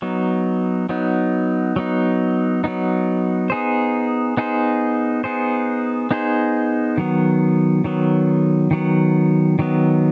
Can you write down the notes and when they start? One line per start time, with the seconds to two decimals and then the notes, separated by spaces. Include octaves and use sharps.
0.02 F#3 B3 D#4
0.89 F#3 B3 D#4
1.76 F#3 B3 D#4
2.64 F#3 B3 D#4
3.50 B3 D#4 G#4 C5
4.37 B3 D#4 G#4 C5
5.24 B3 D#4 G#4 C5
6.11 B3 D#4 G#4 C5
6.98 D#3 F#3 B3
7.84 D#3 F#3 B3
8.71 D#3 F#3 B3
9.59 D#3 F#3 B3